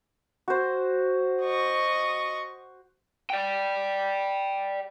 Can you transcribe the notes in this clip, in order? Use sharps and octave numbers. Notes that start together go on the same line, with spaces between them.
F#4 C5
D#5 C#6
D5 G5